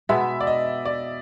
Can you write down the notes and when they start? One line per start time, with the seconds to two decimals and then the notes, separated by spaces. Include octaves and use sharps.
0.09 B2 G#3 B3 E5
0.41 D5
0.47 D#5
0.85 D5